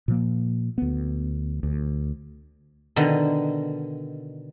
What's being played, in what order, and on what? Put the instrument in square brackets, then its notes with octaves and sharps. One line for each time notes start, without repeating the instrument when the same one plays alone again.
[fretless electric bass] A#2 F3 A#3
D2 B3
D2
[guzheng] B2 D3 D#3